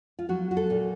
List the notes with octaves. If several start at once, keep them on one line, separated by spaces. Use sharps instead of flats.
F4
F#3 F#4
F#4
A4
A#2